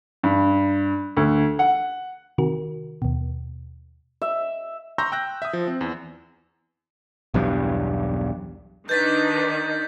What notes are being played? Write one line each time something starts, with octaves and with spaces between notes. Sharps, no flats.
G2
D2
F#5
C3 D#3 F#4 A#4
D#2 B2
E5
A#5 C6 C#6 E6 G6 A#6
G5 E6 F#6 A#6
E5 D#6
F3
C4
E2
B1 E2 G2
D#3 D4 D#4 B4 G6 A6 B6